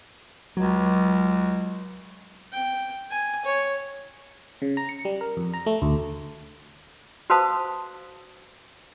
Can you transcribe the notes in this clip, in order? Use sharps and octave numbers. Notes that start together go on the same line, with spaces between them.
C#2 F#3
G5
G#5
C#5
C#3
A#5
C#7
G3
A#4
F2
A#5
A3
D2
F#4 B4 C5 F5 A5 D#6